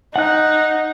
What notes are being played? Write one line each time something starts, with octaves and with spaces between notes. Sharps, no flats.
D#4 F#5 F#6